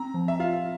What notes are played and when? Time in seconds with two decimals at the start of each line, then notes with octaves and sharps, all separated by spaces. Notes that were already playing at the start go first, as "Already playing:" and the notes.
Already playing: C4 A#5
0.14 F3
0.28 E5
0.39 F4 F5